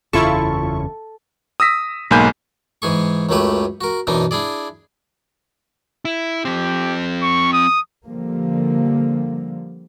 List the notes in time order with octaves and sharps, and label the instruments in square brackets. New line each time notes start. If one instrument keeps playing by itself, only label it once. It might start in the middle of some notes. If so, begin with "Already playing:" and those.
[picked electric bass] F#1 E2 C#3 [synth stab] E4 F4 C#6 [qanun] A4
[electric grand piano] D#6 E6 A#6 B6
B1 G#2 A#3 G#5 B5 G6
[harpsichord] G#2 E3 G#4 C#6
C#2 F#2 F#3 A3 G4 B4
F#4 A#4
F#2 B2 E3 D4 D#4
D4 E4 G#4 D5
[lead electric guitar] E4
[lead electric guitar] F3 C4 [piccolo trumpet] G4
[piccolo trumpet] C#6
D#6
[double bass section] D3 F3 G3 A#3